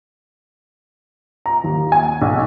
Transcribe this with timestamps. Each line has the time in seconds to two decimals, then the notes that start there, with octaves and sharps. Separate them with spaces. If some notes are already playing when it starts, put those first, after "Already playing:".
1.46 A#5
1.64 D#2
1.92 G#5
2.22 B1